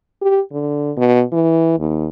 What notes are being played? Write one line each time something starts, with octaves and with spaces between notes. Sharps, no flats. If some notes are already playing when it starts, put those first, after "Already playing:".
G4
D3
B2
E3
D#2